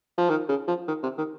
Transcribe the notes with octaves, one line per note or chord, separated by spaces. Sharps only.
F3
D#3
C#3
F3
D#3
C3
D#3